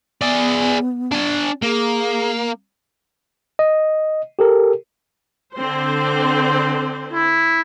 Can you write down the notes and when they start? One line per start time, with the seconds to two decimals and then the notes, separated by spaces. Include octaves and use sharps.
0.22 B3 G#4 D5
1.12 D4 G#5
1.62 A#3 G#4
3.59 D#5
4.39 G4 A4 A#4
5.55 D3 C4 C5
7.13 E4